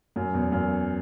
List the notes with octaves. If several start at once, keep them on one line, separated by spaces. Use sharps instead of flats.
F#2
E2
F#2